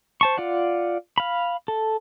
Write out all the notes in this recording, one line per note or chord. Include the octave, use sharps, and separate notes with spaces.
C5 A5 C#6
F4 D5 F#5
F5 B5
A4